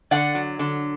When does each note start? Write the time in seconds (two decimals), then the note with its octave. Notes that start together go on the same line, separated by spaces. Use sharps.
0.11 D3 D5 F#5
0.35 F#3
0.59 D3